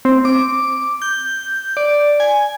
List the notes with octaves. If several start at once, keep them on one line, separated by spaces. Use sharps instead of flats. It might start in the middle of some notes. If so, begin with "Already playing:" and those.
C4
D6
G6
D5
G#5